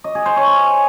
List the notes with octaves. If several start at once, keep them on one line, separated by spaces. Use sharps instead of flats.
D#5
G#4
C5
C#5
G#5